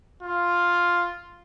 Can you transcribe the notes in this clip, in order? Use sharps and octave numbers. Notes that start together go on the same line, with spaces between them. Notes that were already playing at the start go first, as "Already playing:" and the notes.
F4